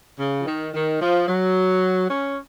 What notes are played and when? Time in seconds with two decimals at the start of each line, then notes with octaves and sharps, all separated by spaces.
0.19 C#3
0.41 F3
0.46 D#3
0.74 D#3
1.01 F3
1.28 F#3
2.10 C#4